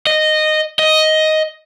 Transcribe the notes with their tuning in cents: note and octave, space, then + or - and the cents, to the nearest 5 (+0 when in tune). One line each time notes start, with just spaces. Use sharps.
D#5 -10
D#5 +5